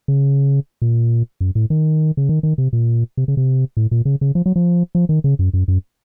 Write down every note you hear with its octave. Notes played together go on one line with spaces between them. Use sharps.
C#3
A#2
F#2
A2
D#3
C#3
D#3
D#3
C3
A#2
C3
C#3
C3
A2
A#2
C#3
C#3
F3
F#3
F3
F3
D#3
C#3
F#2
F#2
F#2